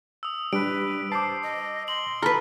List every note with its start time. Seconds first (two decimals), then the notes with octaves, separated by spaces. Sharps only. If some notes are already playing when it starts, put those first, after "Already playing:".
0.23 D#6 E6
0.53 G3 D4 B4 D7
1.12 C5 A5 D6 C7
1.43 D#5
1.88 C6 F#7
2.22 A4 B4 A#5 B5 F6